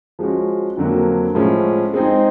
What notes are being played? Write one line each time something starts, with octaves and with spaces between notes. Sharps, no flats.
F3 G#3 C#4 F#4
F2 D3 F#3 A#3
A2 F3 G#3 C#4
G#3 C4 D#4 G#4